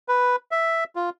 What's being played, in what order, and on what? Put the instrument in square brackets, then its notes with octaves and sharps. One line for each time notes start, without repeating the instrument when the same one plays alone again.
[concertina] B4
E5
F4